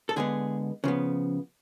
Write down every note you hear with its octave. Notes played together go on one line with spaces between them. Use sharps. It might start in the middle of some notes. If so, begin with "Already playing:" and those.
A4
D3 G#3 B3 G#4
C#3 F3 B3